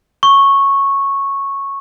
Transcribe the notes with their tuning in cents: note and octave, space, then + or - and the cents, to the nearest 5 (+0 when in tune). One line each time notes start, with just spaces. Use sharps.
C#6 -10